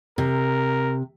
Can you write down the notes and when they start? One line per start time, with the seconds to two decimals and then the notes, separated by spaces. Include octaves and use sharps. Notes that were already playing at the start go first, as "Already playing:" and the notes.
0.18 C3 A#4